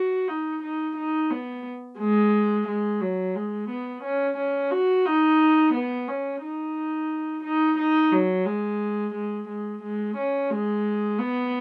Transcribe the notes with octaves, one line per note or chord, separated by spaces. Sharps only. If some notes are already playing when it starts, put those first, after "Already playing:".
Already playing: F#4
D#4
D#4
D#4
B3
G#3
G#3
F#3
G#3
B3
C#4
C#4
F#4
D#4
B3
C#4
D#4
D#4
D#4
F#3
G#3
G#3
G#3
G#3
C#4
G#3
B3